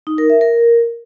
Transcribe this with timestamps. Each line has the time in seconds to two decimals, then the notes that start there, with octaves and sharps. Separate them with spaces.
0.07 D#4
0.18 A#4
0.30 E5
0.41 A#4